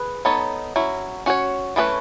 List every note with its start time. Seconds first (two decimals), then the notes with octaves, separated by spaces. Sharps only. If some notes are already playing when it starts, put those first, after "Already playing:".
Already playing: G#4 B4
0.25 B3 D#4 A4 C#5
0.76 F#3 C#4 E4
1.26 C#4 F#4 C#5
1.76 E3 A3 C#4 G#4 B4